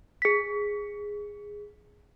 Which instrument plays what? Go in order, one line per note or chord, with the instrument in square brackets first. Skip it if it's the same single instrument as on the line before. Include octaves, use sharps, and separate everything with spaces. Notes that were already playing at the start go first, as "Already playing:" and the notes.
[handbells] G#4 B6